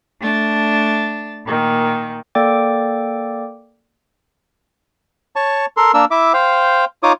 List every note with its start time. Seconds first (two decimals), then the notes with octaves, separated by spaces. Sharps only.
0.21 A3 D4 A6
1.46 A#2 D#3
2.35 A#3 A4 D5 G5 D6
5.36 C#5 A5 C#6
5.77 A4 A#4 C6
5.94 A#3 D4 A#4 E6
6.11 E4 E5 D6
6.34 C5 F5 G5
7.03 D#4 F4 C#5 D6 D#6